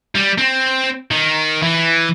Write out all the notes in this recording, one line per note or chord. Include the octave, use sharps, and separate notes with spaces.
G3
C4
D#3
E3